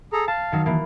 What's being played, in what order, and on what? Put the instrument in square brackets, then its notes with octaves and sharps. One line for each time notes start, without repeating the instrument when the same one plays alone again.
[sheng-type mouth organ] G#4 A4 A#5
[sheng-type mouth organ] F5 [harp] A5
[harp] D#3 F#3 D#4
E3 A#3